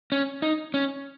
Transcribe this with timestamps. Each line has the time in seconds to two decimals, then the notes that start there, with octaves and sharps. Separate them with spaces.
0.12 C#4
0.42 D#4
0.74 C#4